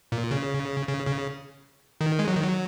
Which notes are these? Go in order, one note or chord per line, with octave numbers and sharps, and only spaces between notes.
A#2
C#3
C#3
C#3
D#3
G#3
F#3
D#3
F#3